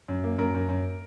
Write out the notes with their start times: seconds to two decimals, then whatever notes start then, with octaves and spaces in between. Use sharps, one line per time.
0.08 F#2
0.24 A#3
0.38 F#2 A#3 A#4
0.55 F#2
0.69 F#2